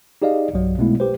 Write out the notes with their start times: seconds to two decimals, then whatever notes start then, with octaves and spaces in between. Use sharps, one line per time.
0.22 D#4 G4 G#4 D5 D#5 F5
0.54 B1 G2 F#3
0.78 B2 G#3 A3 B3 E4
1.00 G4 B4 C5